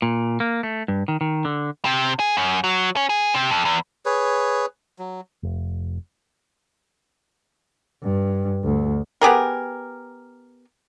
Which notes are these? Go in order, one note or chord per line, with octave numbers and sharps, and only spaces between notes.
A#2
A#3
A3
G2
D#3
D#3
D3
C3
G#4
F#2
F#3
C#4
G#4
C3
F2
E2
G#4 B4 C#5
F#3
F1
G2
D2
B3 G4 G#4 A#4